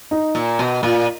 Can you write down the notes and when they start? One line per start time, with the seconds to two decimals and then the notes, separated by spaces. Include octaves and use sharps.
0.11 D#4
0.35 A#2
0.59 B2
0.83 A#2 F4